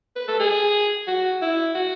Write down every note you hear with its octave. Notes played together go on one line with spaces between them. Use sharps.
B4
A4
G#4
F#4
E4
F#4